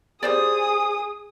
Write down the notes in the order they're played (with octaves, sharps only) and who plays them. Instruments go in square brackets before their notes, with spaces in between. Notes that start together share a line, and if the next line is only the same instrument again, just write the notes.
[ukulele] G4 C5 D5 [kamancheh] G#4 [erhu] D#6